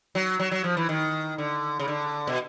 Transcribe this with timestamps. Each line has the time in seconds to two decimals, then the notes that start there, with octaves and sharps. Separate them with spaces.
0.15 F#3
0.40 F#3
0.51 F#3
0.64 F3
0.77 E3
0.89 D#3
1.38 D3
1.79 C#3
1.88 D3
2.27 B2